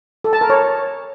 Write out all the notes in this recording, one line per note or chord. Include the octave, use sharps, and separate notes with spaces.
A4
A5
A#4
C#5